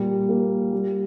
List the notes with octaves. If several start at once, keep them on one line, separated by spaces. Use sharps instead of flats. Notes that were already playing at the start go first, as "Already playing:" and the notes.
Already playing: A#2 G3
A#3
G3